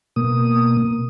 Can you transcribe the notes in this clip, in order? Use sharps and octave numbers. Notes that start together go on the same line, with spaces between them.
B2 A#3 D#6